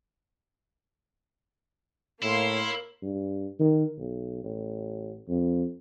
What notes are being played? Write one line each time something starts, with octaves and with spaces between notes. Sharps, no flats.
A2 A#3 E4 C#5 C6 F6
G2
D#3
B1
A1
F2